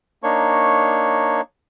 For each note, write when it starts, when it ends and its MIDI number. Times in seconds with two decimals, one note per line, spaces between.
0.23 1.41 58
0.23 1.41 62
0.23 1.41 63
0.23 1.41 73
0.23 1.41 85